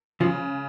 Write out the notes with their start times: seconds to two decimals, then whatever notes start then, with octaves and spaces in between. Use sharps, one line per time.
0.20 C#3 F3